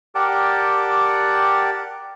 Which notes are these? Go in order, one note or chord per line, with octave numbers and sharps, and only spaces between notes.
G4 A#4 D5 F#5 G5 A5